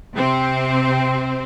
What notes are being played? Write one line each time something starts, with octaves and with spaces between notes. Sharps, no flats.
C3 C4